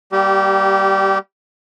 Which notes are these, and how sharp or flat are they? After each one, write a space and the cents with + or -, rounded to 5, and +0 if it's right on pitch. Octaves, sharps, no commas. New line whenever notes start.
G3 +0 A#3 +0 G4 -25